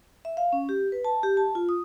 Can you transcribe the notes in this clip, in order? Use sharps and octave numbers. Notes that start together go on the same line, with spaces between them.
E5
F5
C#4
G4
B4
A5
G4
A5
F4
D#6